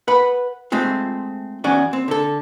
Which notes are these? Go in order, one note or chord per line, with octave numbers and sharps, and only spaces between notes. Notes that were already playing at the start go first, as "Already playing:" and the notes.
B4 F#5 B5
G#3 A3 C4 F4
E2 C#4 F#4 D5 G#5
C4
D3 A4